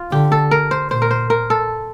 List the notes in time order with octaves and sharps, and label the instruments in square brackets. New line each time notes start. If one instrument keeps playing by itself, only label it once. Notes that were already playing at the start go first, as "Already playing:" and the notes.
Already playing: [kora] F4
[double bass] D3 [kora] G4
[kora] A4
A#4
C5
[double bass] A#2 [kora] C5
[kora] A#4
C5
A#4
A4